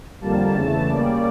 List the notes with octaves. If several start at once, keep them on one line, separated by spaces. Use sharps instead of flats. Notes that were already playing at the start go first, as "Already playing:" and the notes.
F2 D3 G3 A#3 A5
E2 C#3 E3 A3
C#3 G3 A#3 D5